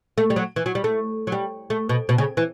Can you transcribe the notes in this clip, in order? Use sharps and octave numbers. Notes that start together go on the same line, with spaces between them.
A3
G3
F#3
E3
F#3
G3
A3
F#3
G3
A3
B2
B2
C#3
E3